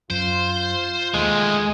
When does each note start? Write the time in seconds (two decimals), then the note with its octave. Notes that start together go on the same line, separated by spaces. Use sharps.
0.10 F#2 F4 C5
1.14 D#2 D#3 G#3 A3